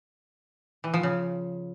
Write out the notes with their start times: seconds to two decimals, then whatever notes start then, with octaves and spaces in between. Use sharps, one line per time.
0.84 E3
0.94 F3
1.03 C#3